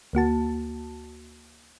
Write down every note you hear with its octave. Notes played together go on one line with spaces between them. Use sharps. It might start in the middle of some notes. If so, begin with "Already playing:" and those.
D2 A#3 F#4 A5